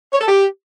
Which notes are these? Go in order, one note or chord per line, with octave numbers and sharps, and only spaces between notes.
C#5
A4
G4